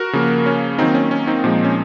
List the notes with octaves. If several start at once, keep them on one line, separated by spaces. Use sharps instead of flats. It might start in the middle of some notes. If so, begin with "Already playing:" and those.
Already playing: F#4 A#4
C#3 F3 A#3
C#4
D#3 F#3 A#3 C4 D#4
C#4
C#4
C4 D#4
A#2 F3 G#3
C#4